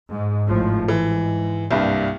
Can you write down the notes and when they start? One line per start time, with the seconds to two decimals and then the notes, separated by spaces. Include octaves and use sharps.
0.12 G#2
0.48 G#1 A2 F3
0.88 G#2 E3
1.71 C2 G2 A#3